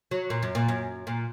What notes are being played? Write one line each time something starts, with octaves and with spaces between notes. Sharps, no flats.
F#3
A#2
F#2
A#2
F#2
A#2